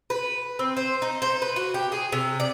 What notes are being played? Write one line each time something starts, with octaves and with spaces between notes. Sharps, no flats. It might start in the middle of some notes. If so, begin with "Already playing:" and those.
B4
C4
C5
D#4
C5
B4
F#4
G4
G#4
C3
D5